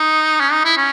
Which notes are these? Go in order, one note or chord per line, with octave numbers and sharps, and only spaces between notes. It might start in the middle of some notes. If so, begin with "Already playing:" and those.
Already playing: D#4
C#4
D#4
E4
C#4